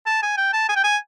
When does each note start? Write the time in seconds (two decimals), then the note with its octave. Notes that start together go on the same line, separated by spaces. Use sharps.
0.06 A5
0.23 G#5
0.37 G5
0.53 A5
0.69 G#5
0.76 G5
0.84 G#5